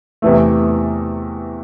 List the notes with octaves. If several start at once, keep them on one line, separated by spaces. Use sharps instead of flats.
E2 C3 E3 A3